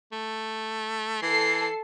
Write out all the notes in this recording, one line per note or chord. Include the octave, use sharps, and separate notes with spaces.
A3
E3 A4 C7